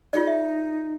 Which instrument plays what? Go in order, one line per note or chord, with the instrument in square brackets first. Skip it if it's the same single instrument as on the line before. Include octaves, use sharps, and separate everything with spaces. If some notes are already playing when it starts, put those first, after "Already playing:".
[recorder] D#4 [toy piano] F4 G#4 D5
[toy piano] E5